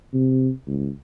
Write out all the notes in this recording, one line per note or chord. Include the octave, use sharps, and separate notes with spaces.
C3
C#2